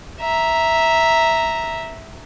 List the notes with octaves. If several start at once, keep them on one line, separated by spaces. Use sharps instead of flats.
E5 A#5